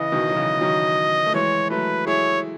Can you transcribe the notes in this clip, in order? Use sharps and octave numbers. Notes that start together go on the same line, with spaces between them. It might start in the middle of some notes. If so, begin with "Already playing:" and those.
Already playing: C#3 E3 D#5
B2 D#3
F#3
C#3 E3
D#3 F#3
A3
E3 G#3 C#5
F#3 A3 B4
E4 G#4 C#5